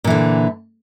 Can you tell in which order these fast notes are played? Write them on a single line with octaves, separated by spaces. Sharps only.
A#2 E3 D3